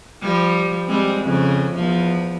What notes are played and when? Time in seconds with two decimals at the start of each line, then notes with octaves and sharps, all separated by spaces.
0.22 F3 G3
0.87 G3 G#3 C4
1.22 F2 C#3
1.74 E2 F3